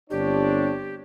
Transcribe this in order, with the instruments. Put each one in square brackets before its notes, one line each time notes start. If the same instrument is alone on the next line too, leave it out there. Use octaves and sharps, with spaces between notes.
[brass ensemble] G1 C#5 [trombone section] C4 D4 [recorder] G4